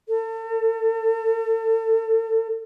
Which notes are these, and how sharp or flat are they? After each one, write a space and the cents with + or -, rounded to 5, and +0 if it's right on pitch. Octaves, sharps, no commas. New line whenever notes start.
A4 +35